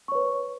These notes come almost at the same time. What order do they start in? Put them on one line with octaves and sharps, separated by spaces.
C#6 C#5 B4